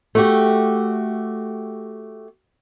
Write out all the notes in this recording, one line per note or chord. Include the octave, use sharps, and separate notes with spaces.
A3 F#4 G4